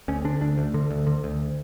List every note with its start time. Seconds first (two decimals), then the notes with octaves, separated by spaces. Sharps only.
0.08 D2 C#4
0.25 D3 D4
0.41 D2 D4
0.58 D2
0.74 D3
0.90 D2
1.07 D3
1.24 D2